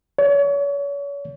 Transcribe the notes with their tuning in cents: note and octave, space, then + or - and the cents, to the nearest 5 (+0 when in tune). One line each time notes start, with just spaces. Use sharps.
C#5 +35